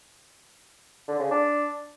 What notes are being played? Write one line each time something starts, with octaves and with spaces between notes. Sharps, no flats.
D3
C#3
D4